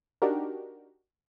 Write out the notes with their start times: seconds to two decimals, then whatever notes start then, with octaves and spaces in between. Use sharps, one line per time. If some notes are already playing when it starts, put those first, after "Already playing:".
0.22 D4 D#4 F#4 G4 A#4